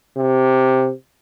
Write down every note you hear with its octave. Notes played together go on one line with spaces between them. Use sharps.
C3